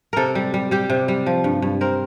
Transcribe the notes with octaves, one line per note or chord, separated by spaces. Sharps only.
C3 A4 A#4
G3
G3
G3 G4
C3
G3
F3
G2
G2
C4 A#4